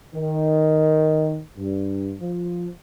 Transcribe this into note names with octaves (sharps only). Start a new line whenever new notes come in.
D#3
G2
F3